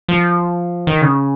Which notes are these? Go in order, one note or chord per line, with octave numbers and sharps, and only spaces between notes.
F3
D#3
C#3